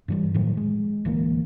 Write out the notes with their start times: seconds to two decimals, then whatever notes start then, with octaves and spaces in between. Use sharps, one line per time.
0.08 G2 E3 G3
0.34 A2 D#3 F3 F#3
0.57 G#3
1.05 D1 E3 A#3